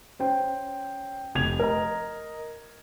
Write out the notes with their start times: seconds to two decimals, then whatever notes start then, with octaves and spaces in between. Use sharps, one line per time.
0.19 C#4 C5 G5
1.35 F1 G#6 F7
1.60 A#4 D#5 A#5